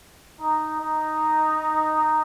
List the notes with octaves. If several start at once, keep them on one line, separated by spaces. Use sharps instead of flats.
D#4
D#4